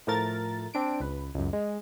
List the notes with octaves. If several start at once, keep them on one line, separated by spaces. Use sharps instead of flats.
A2 F3 A3 A#4 A6
C4 D4 D7
C#2 B4
C#2 F#2
G#3